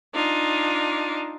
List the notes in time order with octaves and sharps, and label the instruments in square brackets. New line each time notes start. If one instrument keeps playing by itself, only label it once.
[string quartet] D4 D#4 F4